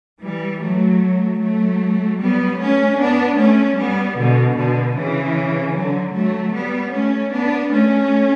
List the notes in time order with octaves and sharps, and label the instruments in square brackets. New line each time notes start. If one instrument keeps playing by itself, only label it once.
[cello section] E3 G3
F#3 A3
F#3 A3
G3 B3
A3 C#4
B3 D4
A3 C#4
G3 B3
B2 D3
B2 D3
C#3 E3
D3 F#3
F#3 A3
G3 B3
A3 C#4
B3 D4
A3 C#4